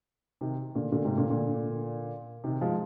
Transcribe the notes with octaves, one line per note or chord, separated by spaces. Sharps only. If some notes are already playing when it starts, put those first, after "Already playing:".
C3 D#3
A#2 D3
A#2 D3
G#2 C3
A#2 D3
A#2 D3
C3 D#3
F3 G#3